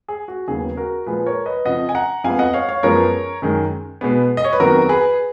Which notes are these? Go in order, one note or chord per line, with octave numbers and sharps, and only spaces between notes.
G#4
F#4
D#2 C#3 F#3 B3 G#4
F#4 A#4
A#2 F3 G#3 G#4 B4
A#4 C#5
B4 D#5
F2 C#3 F3 D#5 F#5
G#5
F#5 A#5
F2 F3 G#3 B3 F5 G#5
D#5 F#5
C#5 F5
C#5 F5
F#2 F3 G#3 B3 A#4 C#5
F#2 D#3 G#3
B2 G#3 B3
D#5
C#5
B4
F2 D#3 F#3 B3 F#4 A#4
G#4 B4